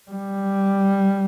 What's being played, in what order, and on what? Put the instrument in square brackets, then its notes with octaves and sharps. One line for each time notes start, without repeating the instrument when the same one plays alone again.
[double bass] G3